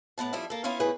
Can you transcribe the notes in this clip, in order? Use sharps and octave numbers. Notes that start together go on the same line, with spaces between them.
A2 B3 F#5 A5
F2 G3 E4 E5
A#3 A4
B3 C#4 E4 F4 C#5 F5
C#3 A3 E4 G#4 B4